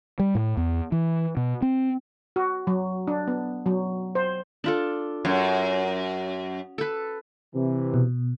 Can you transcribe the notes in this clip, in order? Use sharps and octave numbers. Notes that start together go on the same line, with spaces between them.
G3
A2
E2
E3
B2
C4
F#4
F#3
D4
B3
F#3
C5
D4 F4 A4
F#2 C#5
A4 B4
C3 E3
B2